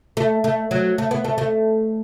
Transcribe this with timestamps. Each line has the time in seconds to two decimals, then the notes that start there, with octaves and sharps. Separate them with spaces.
0.17 A3
0.44 A3
0.71 F#3
0.98 A3
1.11 B3
1.25 A3
1.38 A3